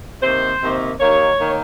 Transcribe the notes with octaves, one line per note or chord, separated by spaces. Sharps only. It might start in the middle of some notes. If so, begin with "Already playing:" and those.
C3 D#3 A#3 C5
C3 D#3 A#3
D#2 D#3 A#3 C#5
D#3 A#3